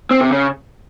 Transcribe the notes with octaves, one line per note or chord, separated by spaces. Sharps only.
C4
C3
C#3